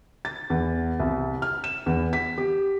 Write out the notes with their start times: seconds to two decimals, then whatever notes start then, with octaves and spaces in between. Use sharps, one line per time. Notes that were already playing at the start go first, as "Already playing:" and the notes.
0.25 A6
0.50 E2
1.00 C2
1.42 F6
1.64 E7
1.86 E2
2.13 B6
2.38 G4